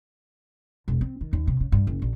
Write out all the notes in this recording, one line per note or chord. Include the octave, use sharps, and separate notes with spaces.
E1
C4
D#3
D#2
C3
C#3
G2
F#1
A#1